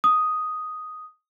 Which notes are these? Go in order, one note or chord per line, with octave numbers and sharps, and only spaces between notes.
D#6